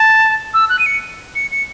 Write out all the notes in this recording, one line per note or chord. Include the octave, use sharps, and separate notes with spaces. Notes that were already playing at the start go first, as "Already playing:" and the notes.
Already playing: A5
E6
F#6
D#7
C#7
C#7
C#7